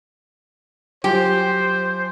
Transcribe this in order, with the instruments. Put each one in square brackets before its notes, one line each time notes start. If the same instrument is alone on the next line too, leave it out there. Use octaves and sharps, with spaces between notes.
[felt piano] F#3 F4 G#5 [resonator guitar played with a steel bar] G4 [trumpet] C5